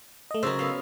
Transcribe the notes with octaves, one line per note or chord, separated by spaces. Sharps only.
A3 D#5
C#3 F#3 A#4 C5 E6
B3 F5